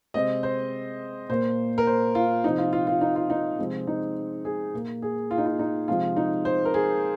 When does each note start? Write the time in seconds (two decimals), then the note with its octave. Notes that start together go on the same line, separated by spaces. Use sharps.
0.14 C3 G#3 C4 D#5
0.43 C5
1.29 A#2 A#3 C5
1.78 A#4
1.87 C5
2.15 F4
2.44 C3 F3 C4 D#4
2.58 F4
2.73 F4
2.87 F4
3.01 D#4
3.16 F4
3.30 D#4
3.58 C3 F3 G#3 C4
3.87 D#4
4.45 G#4
4.73 A#2 A#3
5.02 G#4
5.31 F4
5.38 D#4
5.46 F4
5.59 D#4
5.88 C3 F3 G#3 C4 F4
6.16 D#4
6.45 C5
6.65 A#4
6.74 G#4